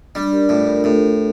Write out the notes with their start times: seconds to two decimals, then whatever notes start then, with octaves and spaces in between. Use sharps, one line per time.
0.15 G3 D4
0.33 G4 A#4
0.49 A2 F4 A4
0.67 G4 A#4
0.84 A2